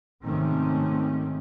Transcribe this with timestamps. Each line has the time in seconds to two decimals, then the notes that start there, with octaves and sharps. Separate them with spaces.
0.25 G#1 C3 D#3 A3 C4 C#4